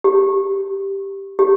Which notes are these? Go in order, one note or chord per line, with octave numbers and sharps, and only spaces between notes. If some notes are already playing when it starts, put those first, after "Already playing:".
G4
G4